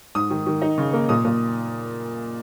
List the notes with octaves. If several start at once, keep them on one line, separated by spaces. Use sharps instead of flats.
G#2 D#6
D#3
D#3
D#4
C#3
A#3
A#2 D#6
A#2